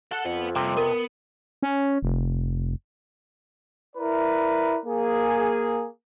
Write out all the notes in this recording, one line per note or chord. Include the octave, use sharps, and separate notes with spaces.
A4 F#5 A5
F2 B3 F#5
C3 G3 A#3
B3 A#4
C#4
F1
E4 A#4 B4 D5
A#3 G#4